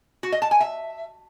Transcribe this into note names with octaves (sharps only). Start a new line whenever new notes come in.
F#4
D#5
A5
G#5
E5